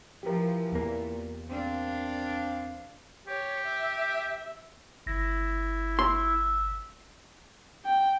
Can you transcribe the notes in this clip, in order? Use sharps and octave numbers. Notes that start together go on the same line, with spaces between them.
E3 F3 G4 A#4
E2 A#2 A#3
C4 D4 F5
G4 C#5
E5
G1 E4 A#6
E5 C6
G5